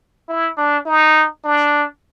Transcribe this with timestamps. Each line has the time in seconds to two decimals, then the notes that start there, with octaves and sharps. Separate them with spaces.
0.29 E4
0.58 D4
0.86 D#4
1.44 D4